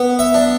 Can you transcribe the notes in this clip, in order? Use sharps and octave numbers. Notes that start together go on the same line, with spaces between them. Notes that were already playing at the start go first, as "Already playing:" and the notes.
Already playing: B3
E5
D4